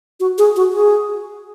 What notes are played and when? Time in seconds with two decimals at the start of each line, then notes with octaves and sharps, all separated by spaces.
0.20 F#4
0.38 G#4
0.56 F#4
0.73 G#4